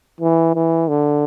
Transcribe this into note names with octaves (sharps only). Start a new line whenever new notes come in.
E3
E3
D3